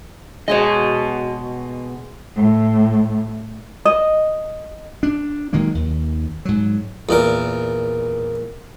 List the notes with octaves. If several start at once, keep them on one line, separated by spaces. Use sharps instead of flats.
B2 G#3 G#4 C#5 D#5
A2
D#5
D4
D#3 F#3 G#3 A#3
D#2
G#2 F#3
E2 A#2 A#4